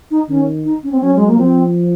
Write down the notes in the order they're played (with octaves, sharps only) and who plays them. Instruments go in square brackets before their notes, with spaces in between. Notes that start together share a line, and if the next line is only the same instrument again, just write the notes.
[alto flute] D#4
[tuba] D#3 [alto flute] C#4
[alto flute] D#4
C#4
C4
[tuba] F#3 [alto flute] C#4
[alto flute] G#3
A#3
[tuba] F3 [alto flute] C4